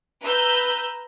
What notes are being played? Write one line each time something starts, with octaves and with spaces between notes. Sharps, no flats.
B4 A#5 E6 G6